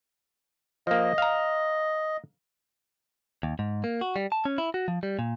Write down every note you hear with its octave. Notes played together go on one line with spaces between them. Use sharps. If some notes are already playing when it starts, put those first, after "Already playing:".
F3 A#3 D#5
F5 A#5
D#2
G#2
A#3
F#4
G3
A5
C#4
E4
F#4
F3
G3
A#2